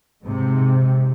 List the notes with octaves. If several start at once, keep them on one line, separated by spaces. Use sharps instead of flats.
G#2 C3